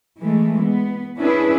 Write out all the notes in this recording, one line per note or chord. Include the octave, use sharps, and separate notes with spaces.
E3 G#3 A3
B3
C#4 D4 E4 G#4 B4